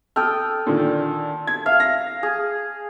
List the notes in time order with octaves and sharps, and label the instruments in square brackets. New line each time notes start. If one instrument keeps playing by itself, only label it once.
[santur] A4 G5 D#6 [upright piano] F6
[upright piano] A#2 D3 D#3
G#6
[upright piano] E5 [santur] F5
[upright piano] A#6
[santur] G#4